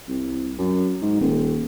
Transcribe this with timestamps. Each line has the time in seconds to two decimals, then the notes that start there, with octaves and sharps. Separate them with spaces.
0.08 C2
0.58 F#2
1.02 G#2
1.21 D#1